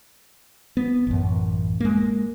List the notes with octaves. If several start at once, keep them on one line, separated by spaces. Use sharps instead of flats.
B3
A1 F#2
G#3 A#3